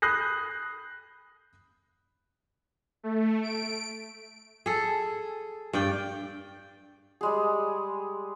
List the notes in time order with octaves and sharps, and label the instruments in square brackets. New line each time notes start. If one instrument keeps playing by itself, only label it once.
[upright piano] B5 D#6 F#6 G6 A#6 C7
[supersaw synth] A3
D7
[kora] G#4 A4
G2 D5 G5
[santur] G3 G#3 G#4